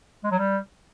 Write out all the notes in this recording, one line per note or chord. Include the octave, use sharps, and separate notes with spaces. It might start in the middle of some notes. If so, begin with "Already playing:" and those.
G#3
F#3
G3